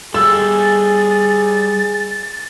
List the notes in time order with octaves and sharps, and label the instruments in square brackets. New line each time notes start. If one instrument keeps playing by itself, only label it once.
[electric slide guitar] G3 A4 [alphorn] G#4 [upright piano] E6 [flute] A6